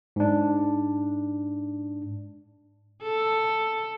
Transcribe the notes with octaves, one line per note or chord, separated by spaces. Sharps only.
G#2 D4
A4